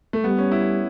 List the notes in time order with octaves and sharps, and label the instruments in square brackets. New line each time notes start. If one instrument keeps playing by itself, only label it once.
[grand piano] A3
[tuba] G3 [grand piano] B3
[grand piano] C#4
E4